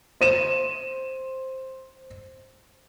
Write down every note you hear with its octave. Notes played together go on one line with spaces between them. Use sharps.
C5 D#7 E7